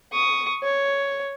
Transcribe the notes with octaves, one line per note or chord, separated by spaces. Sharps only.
C#6 D#6
C#5